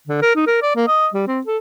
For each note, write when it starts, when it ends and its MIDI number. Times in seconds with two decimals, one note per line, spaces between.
0.07 0.21 50
0.22 0.33 70
0.35 0.43 63
0.47 0.57 70
0.62 0.74 74
0.76 0.85 58
0.88 1.08 75
1.14 1.24 55
1.27 1.41 60
1.47 1.58 69